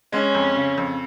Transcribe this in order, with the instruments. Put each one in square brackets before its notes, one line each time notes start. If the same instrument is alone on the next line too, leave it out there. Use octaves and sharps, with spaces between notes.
[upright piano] G#3 [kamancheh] C#4
[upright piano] F2
C#3
F2